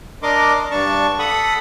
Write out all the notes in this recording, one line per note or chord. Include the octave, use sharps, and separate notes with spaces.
D4 A#4 D#5 C6 D6
G2 D4 A5 C#6
A4 F#5 B5 D#6